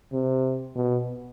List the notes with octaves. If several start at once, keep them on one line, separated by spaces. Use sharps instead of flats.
C3
B2